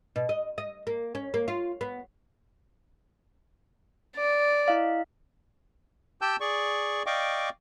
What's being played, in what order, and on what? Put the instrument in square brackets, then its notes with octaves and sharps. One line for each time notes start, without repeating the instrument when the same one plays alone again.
[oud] B2
D#5
D#5
A#3
C#4
A#3
F4
B3
[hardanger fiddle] D5
[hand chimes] E4 D#5 F5
[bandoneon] G4 G5 A5 E6 G6
G#4 D5 C#6
D5 D#5 F5 G5 C#6 D6